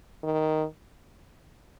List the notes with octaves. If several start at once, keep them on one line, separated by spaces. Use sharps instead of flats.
D#3